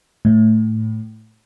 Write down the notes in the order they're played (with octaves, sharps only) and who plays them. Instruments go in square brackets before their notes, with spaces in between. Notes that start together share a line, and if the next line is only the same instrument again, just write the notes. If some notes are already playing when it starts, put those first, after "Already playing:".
[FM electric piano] A2